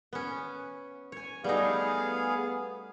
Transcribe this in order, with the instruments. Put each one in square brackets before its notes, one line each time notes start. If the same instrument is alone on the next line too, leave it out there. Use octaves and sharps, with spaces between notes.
[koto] B3 C#4
C#5 G#5
[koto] G3 A3 D#4 [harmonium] B3 G#4 F5